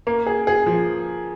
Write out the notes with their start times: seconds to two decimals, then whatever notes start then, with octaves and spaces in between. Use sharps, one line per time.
0.07 A#3
0.27 G#4
0.47 G#4
0.66 F3